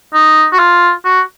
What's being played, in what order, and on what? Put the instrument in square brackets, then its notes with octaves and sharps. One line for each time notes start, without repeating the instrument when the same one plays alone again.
[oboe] D#4
F#4
F4
F#4